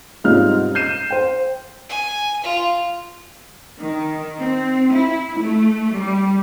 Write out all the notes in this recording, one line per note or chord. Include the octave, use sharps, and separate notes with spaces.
C2 G#2 C#4 F4 F6
G6 C7 D#7 E7
C5 G5
G#5
F4
D#3
C4
E4
A3
G3